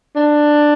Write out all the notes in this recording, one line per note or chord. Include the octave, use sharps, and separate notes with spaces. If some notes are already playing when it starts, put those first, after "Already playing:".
D4